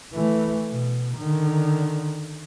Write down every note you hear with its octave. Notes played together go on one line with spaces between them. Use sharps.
E3 A3
B2
D3 D#3